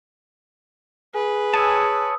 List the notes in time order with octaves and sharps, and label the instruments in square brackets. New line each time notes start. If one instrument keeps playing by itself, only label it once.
[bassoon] G#4 [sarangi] B4
[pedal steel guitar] C#5 G#5 A5 [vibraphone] D#6 E6